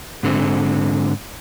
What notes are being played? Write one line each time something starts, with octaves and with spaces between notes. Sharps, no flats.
G#2 D3 C4